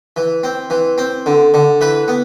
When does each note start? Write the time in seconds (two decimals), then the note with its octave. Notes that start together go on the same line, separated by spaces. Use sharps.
0.16 E3
0.44 C4
0.70 E3
0.98 C4
1.26 D3
1.54 D3
1.81 E3 B4
2.08 B3